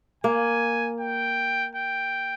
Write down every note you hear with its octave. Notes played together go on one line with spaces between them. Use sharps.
A#3 G#5
G5
G5